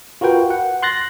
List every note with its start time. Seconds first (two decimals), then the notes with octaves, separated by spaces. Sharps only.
0.21 F4 F#4 A#4 B4 G5
0.50 F#5
0.83 C6 F#6 A6 A#6